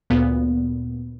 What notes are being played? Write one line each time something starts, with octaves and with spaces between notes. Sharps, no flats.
D2 A#2 B3